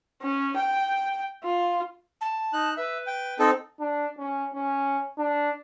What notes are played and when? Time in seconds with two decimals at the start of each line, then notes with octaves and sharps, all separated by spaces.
0.22 C#4
0.56 G5
1.44 F4
2.21 A5
2.53 D#4 F#6
2.77 B4 E5
3.07 G5
3.39 C4 D#4 A4
3.80 D4
4.18 C#4
4.54 C#4
5.18 D4